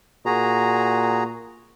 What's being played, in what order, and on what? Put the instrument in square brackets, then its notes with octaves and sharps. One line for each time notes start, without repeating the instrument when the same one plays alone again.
[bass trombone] A#2 [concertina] F#4 G#4 A#5